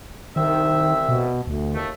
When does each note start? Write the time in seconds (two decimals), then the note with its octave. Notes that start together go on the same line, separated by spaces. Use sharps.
0.36 C2 D#3 C4 E5
1.09 B2
1.47 D2
1.74 D#2 A3